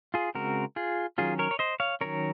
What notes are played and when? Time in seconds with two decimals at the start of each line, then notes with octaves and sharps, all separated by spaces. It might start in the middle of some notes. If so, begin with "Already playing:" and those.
0.14 F4 G#4
0.35 C#3 G#3 C4 F#4 A#4
0.76 F4 G#4
1.18 D#3 F#3 C#4 F4 G#4
1.39 A#4 C#5
1.51 C#5
1.59 C5 D#5
1.80 C#5 F5
2.01 D#3 F#3 C#4 A#4 C#5